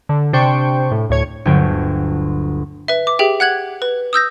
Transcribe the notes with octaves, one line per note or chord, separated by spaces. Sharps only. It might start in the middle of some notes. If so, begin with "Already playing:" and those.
D3
C3 D4 C5 G5 C#6
A2
D2 A2 C#5 G#6
G1 D2 F#3 G5 G#6 D7
B4 E5
D6
G4 G#4 E5 G5
F#5 F#6 G#6 F#7
B4
D#6 E6 G6 A#6